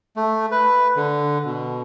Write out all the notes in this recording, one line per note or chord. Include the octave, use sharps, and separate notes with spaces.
A3
B4
D3
B2